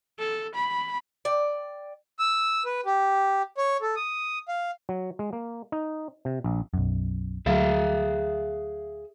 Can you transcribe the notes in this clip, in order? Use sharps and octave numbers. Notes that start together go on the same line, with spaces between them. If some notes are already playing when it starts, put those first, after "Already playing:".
A4
B5
D5 G5
E6
B4
G4
C#5
A4
D#6
F5
F#3
G#3
A#3
D#4
C3
A#1
B1 F#2
D2 F#3 G#4 E5 F5